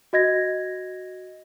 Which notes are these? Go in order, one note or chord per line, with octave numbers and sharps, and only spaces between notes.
F#4 D#5 G#6 A#6